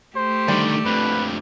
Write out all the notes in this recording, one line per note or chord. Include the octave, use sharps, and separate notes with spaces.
A3 G4 C5
D3 D#3 G3
F2 D3 B4